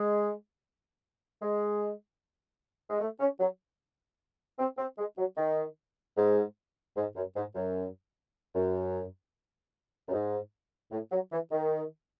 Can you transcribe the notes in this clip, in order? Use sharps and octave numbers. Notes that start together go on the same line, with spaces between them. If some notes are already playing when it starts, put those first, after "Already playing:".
Already playing: G#3
G#3
G#3
A3
C#4
F#3
C4
C4
G#3
F#3
D#3
G#2
G#2
F#2
G#2
F#2
F#2
F#2
G#2
A2
F#3
E3
D#3